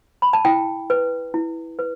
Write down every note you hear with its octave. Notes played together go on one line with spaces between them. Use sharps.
B5
A5
E4 G5
B4
E4
B4